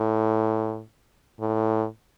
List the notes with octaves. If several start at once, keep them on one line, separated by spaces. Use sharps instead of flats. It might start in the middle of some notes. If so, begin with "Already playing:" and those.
Already playing: A2
A2